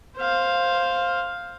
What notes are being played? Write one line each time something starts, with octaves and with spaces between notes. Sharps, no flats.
C5 F5